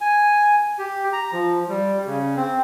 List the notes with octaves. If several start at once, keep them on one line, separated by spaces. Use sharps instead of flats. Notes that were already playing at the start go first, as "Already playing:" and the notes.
G#5
G4
A#5
F3
G3
C#3
C4